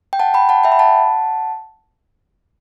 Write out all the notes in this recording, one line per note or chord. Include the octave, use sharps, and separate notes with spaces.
G5
F#5 A5
G5 B5
F#5 A5
E5 G5
B5
F#5 A5